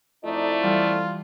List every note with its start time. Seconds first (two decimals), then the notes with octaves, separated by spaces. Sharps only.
0.25 F2 A3 D#4 E4 D5
0.63 E3 G3 F4